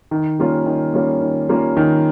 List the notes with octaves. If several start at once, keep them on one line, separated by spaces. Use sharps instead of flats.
D#3
G3 A#3 C#4 F4
D#3
G3 A#3 C#4 F4
D#3
G3 A#3 C#4 F4
D#3